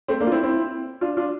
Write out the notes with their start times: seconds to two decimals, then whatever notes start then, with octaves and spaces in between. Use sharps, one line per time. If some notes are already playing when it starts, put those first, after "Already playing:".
0.08 A3 C4
0.20 A#3 D4
0.27 F4
0.32 C4 E4
0.43 C4 E4
1.01 D4 F4
1.17 D4 F4